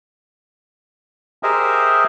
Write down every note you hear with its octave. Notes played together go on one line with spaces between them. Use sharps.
G4 G#4 A#4 C5 D#5 E5